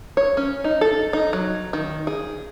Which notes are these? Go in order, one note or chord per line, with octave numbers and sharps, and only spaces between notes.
C#5
C#4
D#4
A4
D#4
F#3
D#3
G#4